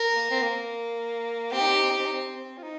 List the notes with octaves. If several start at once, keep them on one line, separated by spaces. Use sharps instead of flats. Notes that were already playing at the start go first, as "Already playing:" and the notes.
Already playing: A#4
A#3
C4
A#3
C4 G4
D#4
C4
D#4
C4
D#4
C4
D#4
C4
C4
F4
D#4